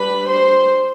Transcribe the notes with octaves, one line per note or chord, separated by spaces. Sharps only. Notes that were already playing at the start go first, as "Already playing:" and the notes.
Already playing: G3 D4 B4 B5
C5 C6